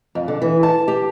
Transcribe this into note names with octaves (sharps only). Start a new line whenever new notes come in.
F2
D3
E3
A5
G4